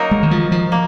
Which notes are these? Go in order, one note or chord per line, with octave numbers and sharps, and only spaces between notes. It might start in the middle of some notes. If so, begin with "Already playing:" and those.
Already playing: F#3 A#3 D#4 A#4
G#3
D#3
F3
F3
A#3